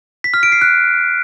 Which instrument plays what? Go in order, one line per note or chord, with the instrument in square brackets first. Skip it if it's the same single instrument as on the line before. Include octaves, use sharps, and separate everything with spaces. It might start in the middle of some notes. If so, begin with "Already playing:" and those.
[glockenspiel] B6
F6
D7
C7
F#6